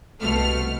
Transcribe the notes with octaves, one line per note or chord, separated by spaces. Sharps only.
C2 B2 A3 F6